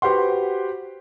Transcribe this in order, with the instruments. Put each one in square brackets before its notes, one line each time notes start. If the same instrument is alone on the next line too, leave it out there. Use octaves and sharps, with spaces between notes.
[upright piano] F#4 G4 B4 C5 F#5 C6